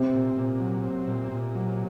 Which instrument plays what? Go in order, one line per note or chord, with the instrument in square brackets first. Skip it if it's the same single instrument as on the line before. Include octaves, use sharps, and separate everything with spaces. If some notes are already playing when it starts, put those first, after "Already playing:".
Already playing: [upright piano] C3 [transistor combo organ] C4
[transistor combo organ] A#2
A#2
F#3
C4
A#2
A#2
F#3